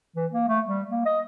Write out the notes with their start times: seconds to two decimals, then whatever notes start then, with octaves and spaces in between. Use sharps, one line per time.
0.16 E3
0.32 A#3
0.48 A3
0.67 G3
0.91 A#3
1.06 D#5